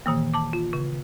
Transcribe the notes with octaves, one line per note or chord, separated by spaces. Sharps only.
A#2 D#3 E3 A#3
A5 D6
F4
C#3